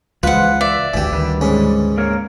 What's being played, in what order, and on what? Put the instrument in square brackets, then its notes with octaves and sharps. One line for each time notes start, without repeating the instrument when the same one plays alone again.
[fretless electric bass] C#2 G#3 [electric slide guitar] E3 F3 [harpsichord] F4 [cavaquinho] B4 F#5
[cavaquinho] D5 [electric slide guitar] E5
[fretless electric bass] G#1 D2 [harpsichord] E3 G4
[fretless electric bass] D2 [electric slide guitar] D#3 G3 B4
[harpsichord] G#2 C#4
[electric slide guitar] A#3 A#4 C#5